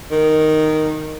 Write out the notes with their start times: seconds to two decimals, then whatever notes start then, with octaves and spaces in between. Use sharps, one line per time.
0.11 D#3